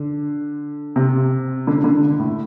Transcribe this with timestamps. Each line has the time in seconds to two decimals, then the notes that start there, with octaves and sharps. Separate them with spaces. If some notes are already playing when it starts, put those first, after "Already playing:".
Already playing: D3
0.96 C3
1.67 D3
1.84 D3
2.19 A2